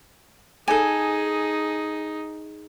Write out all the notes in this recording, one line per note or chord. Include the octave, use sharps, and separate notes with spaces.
D#4 G#4 A4 G#5